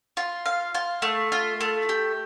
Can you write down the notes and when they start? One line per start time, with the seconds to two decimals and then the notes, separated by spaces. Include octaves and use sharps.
0.17 F4
0.46 F5
0.75 F4
1.02 A3
1.32 F4
1.61 A3
1.89 G4